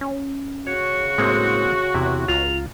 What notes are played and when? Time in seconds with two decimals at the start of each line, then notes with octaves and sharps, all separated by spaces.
0.01 C#4
0.67 C#3 F#4 C#5 C#7
1.18 A2 G#3 A#3 C4
1.95 E2 C3 E4
2.28 C#2 F4 A#5 F7